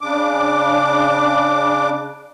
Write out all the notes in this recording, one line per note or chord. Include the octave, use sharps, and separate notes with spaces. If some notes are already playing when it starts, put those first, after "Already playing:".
C#3 D4 D6